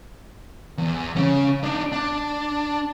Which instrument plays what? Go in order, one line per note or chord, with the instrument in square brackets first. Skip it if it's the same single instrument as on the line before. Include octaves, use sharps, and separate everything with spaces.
[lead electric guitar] E2
C#3 C#4
D4 D#4
D4